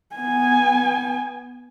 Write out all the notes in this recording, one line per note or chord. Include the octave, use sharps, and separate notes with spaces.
B3 G#5